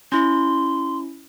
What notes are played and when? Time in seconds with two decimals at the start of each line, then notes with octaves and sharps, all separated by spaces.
0.12 C#4 E4 C6